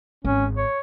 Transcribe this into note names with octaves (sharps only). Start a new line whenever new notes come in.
G#1 C#4
C#5